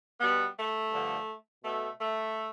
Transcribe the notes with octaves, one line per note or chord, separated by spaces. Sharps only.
B2 G3 B3
A3
G2 D3 F3
B2 A3
A3